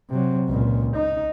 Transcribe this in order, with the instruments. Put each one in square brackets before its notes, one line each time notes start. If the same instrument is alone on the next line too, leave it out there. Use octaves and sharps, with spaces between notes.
[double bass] C3 F#3
C#2 A#2
D#4